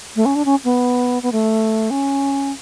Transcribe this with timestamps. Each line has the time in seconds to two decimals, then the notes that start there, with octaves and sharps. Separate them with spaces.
0.16 A3
0.25 C#4
0.35 D4
0.45 C#4
0.64 B3
1.23 B3
1.32 A3
1.90 C#4